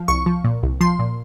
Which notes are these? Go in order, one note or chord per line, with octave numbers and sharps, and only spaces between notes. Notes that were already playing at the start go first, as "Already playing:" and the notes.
Already playing: F3
C2 C#6
F3
A#2
C2
F3 C6
A#2